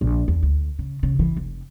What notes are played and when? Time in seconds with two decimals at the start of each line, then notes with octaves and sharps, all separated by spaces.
0.01 A#1
0.28 E2
0.43 D2
0.79 C#3
1.03 C#3
1.19 E3
1.37 F1